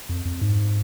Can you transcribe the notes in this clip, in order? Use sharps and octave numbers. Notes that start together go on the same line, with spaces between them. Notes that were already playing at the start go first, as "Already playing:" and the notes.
F2
F2
G#2